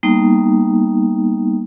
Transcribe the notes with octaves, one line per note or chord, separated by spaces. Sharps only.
G3 A#3 B3 D#4